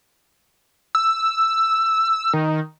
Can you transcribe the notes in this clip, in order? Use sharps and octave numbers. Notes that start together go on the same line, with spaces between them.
E6
D#3